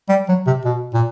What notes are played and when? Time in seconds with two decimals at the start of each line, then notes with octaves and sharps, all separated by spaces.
0.09 G3
0.29 F#3
0.46 C3
0.65 B2
0.94 A#2